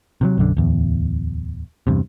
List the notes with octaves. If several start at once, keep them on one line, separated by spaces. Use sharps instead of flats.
C3 E3 F#3
B1 F#2 D3
D1 E2
E2 G2 C3